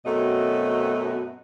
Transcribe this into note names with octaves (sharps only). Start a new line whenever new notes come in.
F#2 B2 A3 C4 F#4 D#5